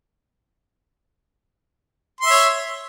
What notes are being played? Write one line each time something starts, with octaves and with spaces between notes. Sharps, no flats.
C#5 E5 C6